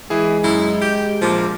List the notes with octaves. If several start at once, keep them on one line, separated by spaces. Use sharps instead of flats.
E3 G#3 E4 G#4
F#2 E4
G4 G6
A#1 F3 A#3 D6